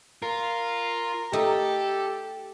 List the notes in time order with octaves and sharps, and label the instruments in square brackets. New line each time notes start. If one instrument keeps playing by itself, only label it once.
[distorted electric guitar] F4 [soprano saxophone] A#4
[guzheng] A3 D#4 [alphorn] G4 [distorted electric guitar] A4